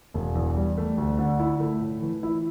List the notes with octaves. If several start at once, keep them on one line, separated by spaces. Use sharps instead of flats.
E1
E2
G3
A3
D2
D3
E4
A3
A2
E3
E4